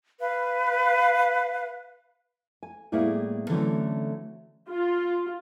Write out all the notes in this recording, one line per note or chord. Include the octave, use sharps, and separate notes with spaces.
B4 F5
G#5
A2 G3 A#3 B3 E4 G#4
D3 E3 F#3 A3 C4 C#4
F4